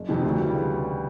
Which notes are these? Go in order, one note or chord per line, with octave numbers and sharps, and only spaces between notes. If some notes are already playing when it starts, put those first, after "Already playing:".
Already playing: F#1
F2 C3 D#3
D2
C#3 E3 G3